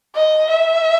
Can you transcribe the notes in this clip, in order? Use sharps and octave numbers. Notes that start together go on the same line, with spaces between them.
D#5
E5